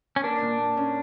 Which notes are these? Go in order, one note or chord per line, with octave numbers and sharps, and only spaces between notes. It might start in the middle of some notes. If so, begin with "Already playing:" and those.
C#4
A#3 D4
A#2
A#2
C#4